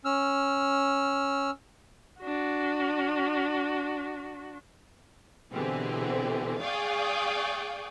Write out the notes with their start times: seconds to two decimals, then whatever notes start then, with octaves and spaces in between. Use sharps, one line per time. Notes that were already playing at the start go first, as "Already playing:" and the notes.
0.05 C#4 E6 F6
2.20 D4 F#4
5.53 B2 D3 E3 C4 G4 G#4
6.61 G#4 D5 F5 G5 C#6 D#6